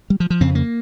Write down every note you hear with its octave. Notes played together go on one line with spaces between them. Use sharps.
G3
F3
F3
F2 C#3 C4
A#3